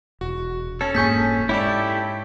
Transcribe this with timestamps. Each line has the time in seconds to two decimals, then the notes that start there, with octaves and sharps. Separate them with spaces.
0.21 E1 F#4
0.81 C#4 A4 C#5 A5
0.95 F1 G#2 A#3 G#4 G#5 C#6 G6 B6
1.49 G#2 E4 G4 A4 C#5 D5